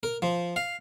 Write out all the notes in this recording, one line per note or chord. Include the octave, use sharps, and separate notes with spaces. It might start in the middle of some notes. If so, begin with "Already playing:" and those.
A#4
F3
F5